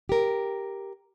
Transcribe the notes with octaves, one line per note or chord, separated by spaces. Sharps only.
G4 A#4